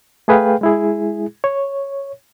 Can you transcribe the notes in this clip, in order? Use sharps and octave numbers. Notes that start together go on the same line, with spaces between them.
A3 G#4 B4 F5 G5
G#3 E4 G#4
C#5